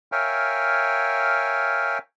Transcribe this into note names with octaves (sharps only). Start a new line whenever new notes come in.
A#4 C#5 E5 F5 G5 G#5